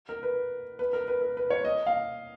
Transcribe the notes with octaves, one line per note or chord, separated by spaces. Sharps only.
A#4
B4
B4
A#4
B4
A#4
B4
C#5
D#5
F5